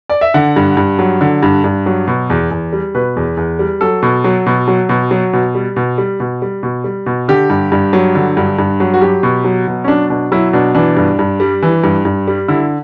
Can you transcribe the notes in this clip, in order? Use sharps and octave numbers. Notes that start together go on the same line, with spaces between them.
D5
E5
D3 F#5
G2
G2
F#3
D3
G2
G2
F#3
B2
E2
E2
G3
B2 B4
E2
E2
G3
F#3 A4
B2
F#3
B2
F#3
B2
F#3
B2
G3
B2
G3
B2
G3
B2
G3
B2
D3 G4
G2
G2
F#3
D3
G2
G2
F#3
F#4
F#3 G4
B2
F#3
B2
C#4
F#3 D4
B2 D4
F#3 E4
B2 D4
E3 D4
G2
G2
G3
E3
G2
G2
G3
D3 E4